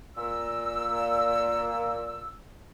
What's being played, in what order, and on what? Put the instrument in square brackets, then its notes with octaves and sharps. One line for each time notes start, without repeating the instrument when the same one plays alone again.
[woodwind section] A#2 E6